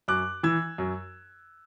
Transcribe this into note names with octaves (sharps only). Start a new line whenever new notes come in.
F#2 D6 F#6
E3 E6 G#6
F#2